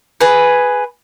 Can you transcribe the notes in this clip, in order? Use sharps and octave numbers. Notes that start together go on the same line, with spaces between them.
G#4 B4